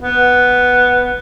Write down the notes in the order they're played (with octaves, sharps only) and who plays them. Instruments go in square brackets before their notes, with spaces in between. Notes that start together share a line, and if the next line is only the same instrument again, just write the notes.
[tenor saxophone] B3